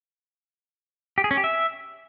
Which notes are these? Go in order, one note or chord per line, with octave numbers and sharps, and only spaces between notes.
G4
G#4
C#4
G4
E5